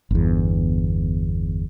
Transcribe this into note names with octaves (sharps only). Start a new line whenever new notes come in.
G1 E2